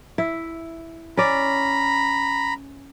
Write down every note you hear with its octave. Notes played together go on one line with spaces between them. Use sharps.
E4
C#4 D5 A#5 B5